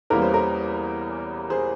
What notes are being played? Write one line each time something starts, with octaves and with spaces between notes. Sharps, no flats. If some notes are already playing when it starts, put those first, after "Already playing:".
E2 E3 G3 A#3 C#4 A#4
C5
A#4
G#4 C5